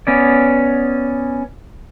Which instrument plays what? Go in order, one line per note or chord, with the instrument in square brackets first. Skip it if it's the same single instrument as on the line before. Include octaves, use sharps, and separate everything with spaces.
[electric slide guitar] B3 C#4 D5